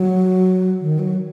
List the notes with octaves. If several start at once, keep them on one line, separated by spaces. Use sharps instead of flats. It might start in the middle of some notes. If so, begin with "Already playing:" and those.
Already playing: F#3
D#3
F#3